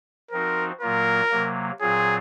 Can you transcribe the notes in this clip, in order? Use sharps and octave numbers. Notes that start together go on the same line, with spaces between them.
F3 C4 D#4 F#4 A#4
A#2 F#3 A#3 F4 A#4
C3 F#3 A#3
A#2 F#3 C4 F4 G#4